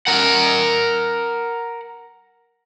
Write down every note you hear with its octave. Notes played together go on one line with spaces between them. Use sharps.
A#4 F#5